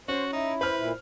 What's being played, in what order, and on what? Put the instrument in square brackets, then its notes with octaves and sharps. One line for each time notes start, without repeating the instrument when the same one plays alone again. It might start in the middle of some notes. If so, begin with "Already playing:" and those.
[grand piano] C#4 [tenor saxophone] F#4 [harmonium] C5
[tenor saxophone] D#4 [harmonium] E4
[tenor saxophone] B4 [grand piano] C5 F6
[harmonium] A#2 E4